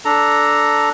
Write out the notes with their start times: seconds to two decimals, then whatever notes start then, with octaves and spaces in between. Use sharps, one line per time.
0.05 D4 A4 A#5